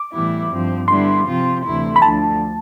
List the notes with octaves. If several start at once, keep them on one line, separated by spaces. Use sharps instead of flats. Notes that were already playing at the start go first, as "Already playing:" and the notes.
Already playing: D6
A2 E3 G3 B3 E4
G2 F3 C4
D3 G3 B3 E4 C6
C3 F3 C4 F4
D2 C3 E3 A3 E4
B5
D2 D3 F3 A5